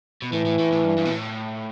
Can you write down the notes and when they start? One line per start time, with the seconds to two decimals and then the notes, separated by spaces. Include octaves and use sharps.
0.22 B2
0.33 A2 E3
0.45 A2
0.59 A2
0.72 A2
0.84 G2
0.97 G2
1.05 B2
1.10 A2